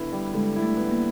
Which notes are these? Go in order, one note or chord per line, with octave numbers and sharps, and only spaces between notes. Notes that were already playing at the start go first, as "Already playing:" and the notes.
Already playing: D3 B3 E4
G3
D3 G#3
E4
A3
B3
A#3